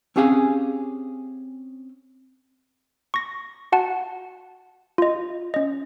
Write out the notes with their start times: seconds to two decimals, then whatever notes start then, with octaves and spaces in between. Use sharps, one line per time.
0.16 C4 C#4 G4 G#4 F5 G#5
3.14 C#6 A#6
3.72 F#4 F#5 A5
4.98 F4 D#5
5.54 C#4 D#5